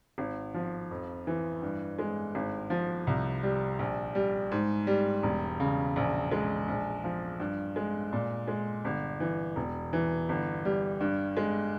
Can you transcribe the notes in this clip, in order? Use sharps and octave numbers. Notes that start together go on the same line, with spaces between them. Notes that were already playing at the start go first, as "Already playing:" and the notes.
G#1
F3
F2
E3
G2
G#3
G#1
F3
C2
G3
A#1
G3
G#2
G3
E1
C#3
A#1
G#3
A#1
F3
G2
G#3
A#2
G#3
G1
E3
E1
E3
G1
G3
G2
G#3